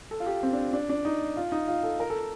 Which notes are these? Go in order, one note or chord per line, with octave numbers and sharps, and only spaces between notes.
A4
F4
G4
C4
D4
D4
D4
D#4
F4
D#4
F4
A4
A#4
A4